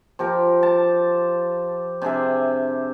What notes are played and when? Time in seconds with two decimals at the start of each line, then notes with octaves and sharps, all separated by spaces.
0.19 F3 G4 A#4
0.63 A5
2.02 C3 D4 G#4 E5